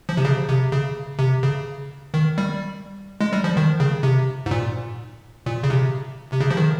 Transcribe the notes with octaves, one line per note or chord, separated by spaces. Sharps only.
F3
C3
C#3
C3
C#3
C3
C#3
D#3
G3
G#3
G3
F3
D#3
C#3
C3
G#2
A#2
A#2
C#3
C3
C3
C#3
F3
D#3